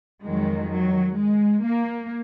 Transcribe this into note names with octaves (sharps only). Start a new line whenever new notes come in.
F2 D#3 F#3 G#3
F#3
G#3
A#3